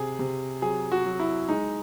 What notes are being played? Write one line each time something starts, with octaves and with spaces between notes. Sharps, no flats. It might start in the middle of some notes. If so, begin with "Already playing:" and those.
Already playing: C3 G#4
C3
F#3 G#4
F#4
F#3
E4
G#3 D#4